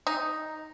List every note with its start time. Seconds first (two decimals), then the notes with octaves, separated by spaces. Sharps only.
0.07 D#4